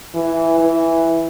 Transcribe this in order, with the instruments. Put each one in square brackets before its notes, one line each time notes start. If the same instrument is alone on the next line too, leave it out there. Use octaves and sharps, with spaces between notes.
[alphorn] E3
E3